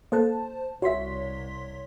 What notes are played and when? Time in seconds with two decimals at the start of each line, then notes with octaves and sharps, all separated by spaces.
0.12 A#3 A4 C5 A5 F#6
0.82 C2 F#4 C#5 E5 C6 B6